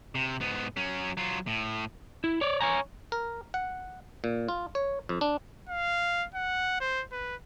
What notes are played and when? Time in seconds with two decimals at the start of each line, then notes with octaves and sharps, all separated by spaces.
0.15 C3
0.41 G#2 B3
0.77 F#3 C#4
1.17 F#3 F4
1.47 A2
2.24 E4
2.41 C#5 D5
2.61 C#5 G#5 A#5
3.12 A#4
3.54 F#5
4.24 A#2
4.48 F4
4.75 C#5
5.09 F2
5.21 D4
5.69 F5
6.34 F#5
6.80 C5
7.12 B4